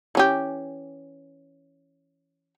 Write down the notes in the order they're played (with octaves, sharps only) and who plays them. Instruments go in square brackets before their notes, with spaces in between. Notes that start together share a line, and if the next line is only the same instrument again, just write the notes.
[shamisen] E3 C#4 G4